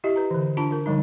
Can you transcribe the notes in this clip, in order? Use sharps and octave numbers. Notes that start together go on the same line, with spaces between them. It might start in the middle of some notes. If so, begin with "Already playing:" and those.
E4 G4 D#5 E5
B4 A#5
D3 E3
D4 F4 A5 B5
F4 A#4
D3 F3 G3 G#3 D#4